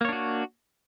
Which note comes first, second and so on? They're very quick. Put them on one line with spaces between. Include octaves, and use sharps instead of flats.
A#3 C#5 D4 F#4